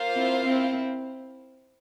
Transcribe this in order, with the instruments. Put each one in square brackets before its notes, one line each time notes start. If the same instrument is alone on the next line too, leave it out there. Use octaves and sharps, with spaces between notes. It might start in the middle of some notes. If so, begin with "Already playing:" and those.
Already playing: [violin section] A#3 F4 C5 F5
[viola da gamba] C4 E4
C4 E4